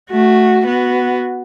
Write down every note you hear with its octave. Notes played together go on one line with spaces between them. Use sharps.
A3 F#4
B3 F#4